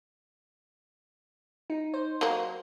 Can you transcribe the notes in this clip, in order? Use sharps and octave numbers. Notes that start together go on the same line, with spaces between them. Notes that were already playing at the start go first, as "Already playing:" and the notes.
D#4
C5
F#3 A#3